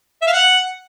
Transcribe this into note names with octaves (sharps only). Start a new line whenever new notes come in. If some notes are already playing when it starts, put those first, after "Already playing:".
E5
F5
F#5